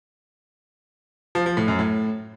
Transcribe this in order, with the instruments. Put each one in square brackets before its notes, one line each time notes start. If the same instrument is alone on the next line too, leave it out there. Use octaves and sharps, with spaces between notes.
[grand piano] F3
F3
A2
F#2
A2